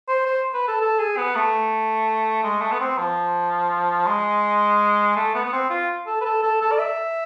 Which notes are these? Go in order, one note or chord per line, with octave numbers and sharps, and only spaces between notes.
C5
C5
B4
A4
A4
G#4
B3
A3
G#3
A3
B3
C4
F3
G#3
A3
B3
B3
C4
F4
A4
B4
A4
A4
A4
D5
E5